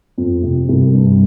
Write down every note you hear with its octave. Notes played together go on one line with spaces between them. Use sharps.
F2
C3
C2
G2